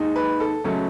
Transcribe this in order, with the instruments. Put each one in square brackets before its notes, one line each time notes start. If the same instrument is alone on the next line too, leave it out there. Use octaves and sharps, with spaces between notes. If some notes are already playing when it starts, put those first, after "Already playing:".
Already playing: [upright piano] D#2 D#3 G#3 D#4
B4
A4
C#2 C#3 F#3 A3 C#4 A4